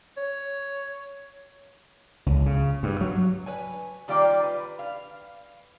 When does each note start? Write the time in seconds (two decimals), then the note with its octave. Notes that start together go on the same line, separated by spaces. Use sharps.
0.17 C#5
2.26 C#2
2.46 C#3
2.83 G2
3.01 F#3
3.46 B4 C#5 G#5
4.08 D#3 G3 A#3 F4 D5 G5
4.43 B4
4.79 F5